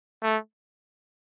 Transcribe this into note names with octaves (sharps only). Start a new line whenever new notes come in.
A3